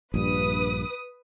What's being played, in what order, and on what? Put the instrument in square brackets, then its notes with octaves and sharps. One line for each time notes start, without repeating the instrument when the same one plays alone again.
[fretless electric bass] A#1 G2 [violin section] B4 D#6